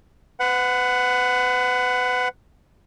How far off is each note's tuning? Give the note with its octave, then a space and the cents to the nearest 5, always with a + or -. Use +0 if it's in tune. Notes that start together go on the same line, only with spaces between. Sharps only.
B4 +30 F#5 +0